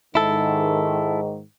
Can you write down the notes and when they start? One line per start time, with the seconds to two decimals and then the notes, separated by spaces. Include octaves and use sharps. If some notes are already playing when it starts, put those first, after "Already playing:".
0.15 G#2 D#3 E4 A4